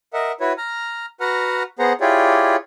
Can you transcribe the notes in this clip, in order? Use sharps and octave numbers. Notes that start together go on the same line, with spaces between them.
A#4 D#5 E5 F#5
E4 F#4 B4 C#5
A#5 F6
F#4 B4 F#5 A#5 F6
B3 G#4 C5 F#5 A#5
E4 F4 G4 G#4 C#5 D5